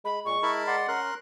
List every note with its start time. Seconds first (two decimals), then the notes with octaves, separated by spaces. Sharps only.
0.05 G#3 B5
0.25 A#2 G#3 C#6
0.43 E4 A#4 A5 B5
0.67 D5 F#5 C6
0.88 C#4 A#4 C6 F#6